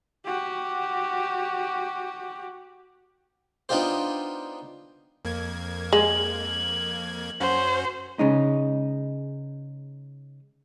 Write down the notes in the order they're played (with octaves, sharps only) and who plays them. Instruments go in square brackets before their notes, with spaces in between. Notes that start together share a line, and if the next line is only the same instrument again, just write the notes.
[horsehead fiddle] F#4 G4
[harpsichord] B3 D4 D#4 F4 G4 C5
[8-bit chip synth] F2 A#3 G#6
[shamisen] G#3 [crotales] F#7
[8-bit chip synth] F#2 C#4 F#4 [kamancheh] C5
[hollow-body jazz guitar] C#3 G#3 D#4